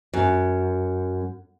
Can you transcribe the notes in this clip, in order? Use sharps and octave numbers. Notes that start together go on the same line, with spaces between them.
F#2